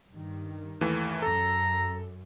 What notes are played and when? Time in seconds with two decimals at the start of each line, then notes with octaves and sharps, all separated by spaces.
0.11 G2 D#3
0.81 D#2 E3 A3
1.22 F#2 A4 A#5